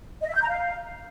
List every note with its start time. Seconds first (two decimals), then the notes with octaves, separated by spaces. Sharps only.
0.21 D#5
0.28 E5
0.35 G6
0.42 A#5
0.49 F5